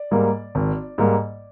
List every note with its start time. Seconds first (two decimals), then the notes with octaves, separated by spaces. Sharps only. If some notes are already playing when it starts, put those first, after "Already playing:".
Already playing: D5
0.11 G#2 G3 A#3
0.55 G#1
0.98 G#2 G3 A#3